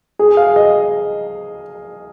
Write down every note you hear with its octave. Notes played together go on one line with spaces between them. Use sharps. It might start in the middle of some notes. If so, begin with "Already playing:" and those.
G#4
F5
D#5